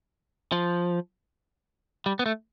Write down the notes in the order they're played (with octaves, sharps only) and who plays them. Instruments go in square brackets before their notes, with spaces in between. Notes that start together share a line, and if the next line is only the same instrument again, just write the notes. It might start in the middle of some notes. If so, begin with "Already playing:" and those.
[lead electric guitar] F3
G3
B3
A3